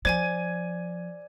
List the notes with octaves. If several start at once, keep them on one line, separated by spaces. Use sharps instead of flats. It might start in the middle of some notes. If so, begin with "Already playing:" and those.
F3 C5 D5 G#5 G#6 D#7